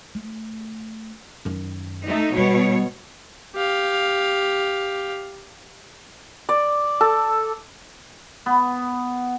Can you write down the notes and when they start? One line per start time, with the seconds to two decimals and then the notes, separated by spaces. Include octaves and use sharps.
0.15 A3
1.45 F#2 D#3
2.06 A3 D#4
2.35 B2 D#3 G3 C#5
3.55 G4 F5
6.49 D5
7.01 A4
8.46 B3